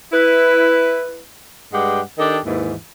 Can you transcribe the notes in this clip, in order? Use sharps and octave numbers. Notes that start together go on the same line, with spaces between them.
E4 B4
G2 G#3 G4 F#5
D#3 D4 G4 A4 D#5
D#2 G#2 E3